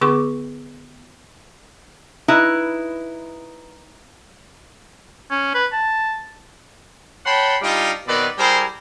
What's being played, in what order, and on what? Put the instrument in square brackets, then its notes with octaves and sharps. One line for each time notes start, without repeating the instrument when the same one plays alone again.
[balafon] D3 B3 G#4 C#6 D6
[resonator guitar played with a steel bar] D#4 E4 B4
[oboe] C#4
B4
A5
[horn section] C#5 F#5 G5 A5 B5 C6
G3 D4 D#4 F4
B2 D#3 B3 C4 B4 D5
G3 E4 G4 G#4 A#4 C5